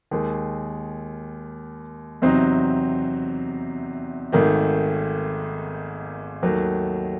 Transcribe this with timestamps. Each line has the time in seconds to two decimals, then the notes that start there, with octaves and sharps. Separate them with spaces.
0.11 D#2 D#3 G#3
2.22 E2 C3 F#3 C4 D#4
4.32 G#1 G#2 D#3 A3
6.43 D#2 D#3 F#3 A3